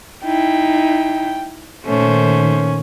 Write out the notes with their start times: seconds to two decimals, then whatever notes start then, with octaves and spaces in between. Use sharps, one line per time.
0.24 D#4 E4 G5
1.86 A#2 D#3 A3 C#4 C5